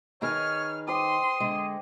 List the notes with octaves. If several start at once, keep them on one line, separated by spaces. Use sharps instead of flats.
D#3 D#4 G#4 B4 C#5 B5 F6
G4 C5 G5 C6 D#6
D3 G#3